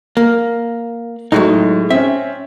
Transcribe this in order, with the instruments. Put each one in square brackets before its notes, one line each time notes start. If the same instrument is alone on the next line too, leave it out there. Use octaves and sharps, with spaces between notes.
[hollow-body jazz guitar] A#3
[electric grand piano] A2 [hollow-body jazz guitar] F#3 G#3 D#4
[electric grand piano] C4 C#4 [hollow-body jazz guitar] E5